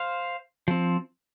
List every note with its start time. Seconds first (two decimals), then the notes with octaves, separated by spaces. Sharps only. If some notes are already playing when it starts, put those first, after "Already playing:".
Already playing: C5 F5
0.68 F3 C4